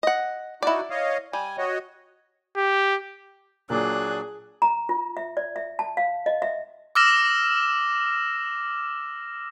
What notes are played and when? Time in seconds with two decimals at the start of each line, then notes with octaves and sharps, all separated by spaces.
0.03 D#5 F#5
0.63 D#4 E4 F#4 D5
0.90 C#5 D#5 F5
1.33 G3 G#5
1.58 F#4 C#5 D#5
2.57 G4
3.70 A#2 F#3 D4 G#4 D5 F#6
4.62 A#5
4.89 F4
5.17 E5
5.37 D5
5.56 E5
5.79 A5
5.97 F5
6.26 D#5
6.42 E5
6.95 D6 E6 F6 A#6 E7